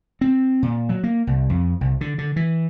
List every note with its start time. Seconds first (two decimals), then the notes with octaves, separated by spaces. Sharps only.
0.21 C4
0.63 A#2
0.89 F#3
1.04 A#3
1.27 C2
1.50 F2
1.81 C2
2.01 D3
2.18 D3
2.36 E3